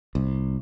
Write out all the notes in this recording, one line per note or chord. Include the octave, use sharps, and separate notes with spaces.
C2